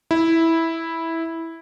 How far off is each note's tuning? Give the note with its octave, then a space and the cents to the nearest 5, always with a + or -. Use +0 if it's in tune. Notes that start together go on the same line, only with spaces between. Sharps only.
E4 -10